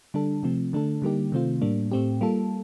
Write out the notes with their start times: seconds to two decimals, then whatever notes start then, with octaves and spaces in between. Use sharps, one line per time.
0.14 D3 G3 D4 A4
0.43 C3 F3 A3 C4
0.73 D3 A3 D4 A4
1.02 D3 G3 A#3 D#4 G4
1.32 C3 D#3 A3 C4 F4
1.62 A2 G3 A#3 D4
1.92 A2 A3 C4 G4
2.21 G3 A#3 F4 A4